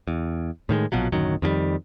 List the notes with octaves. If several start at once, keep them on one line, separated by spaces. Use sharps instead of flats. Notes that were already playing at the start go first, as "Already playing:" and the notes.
E2
A2 D#3 F3 G#3
A#1 B2 F3 F#3
D1 F#2 D#3 F#3
F2 D#3 F#3 G3